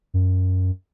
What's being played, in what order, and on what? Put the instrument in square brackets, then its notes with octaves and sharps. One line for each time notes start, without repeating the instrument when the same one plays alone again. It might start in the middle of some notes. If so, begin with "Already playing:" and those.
[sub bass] F#2